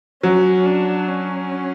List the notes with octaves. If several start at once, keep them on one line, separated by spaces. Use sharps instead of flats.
F#3 C#4
D4
C#4